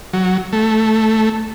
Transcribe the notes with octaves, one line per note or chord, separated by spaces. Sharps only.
F#3
A3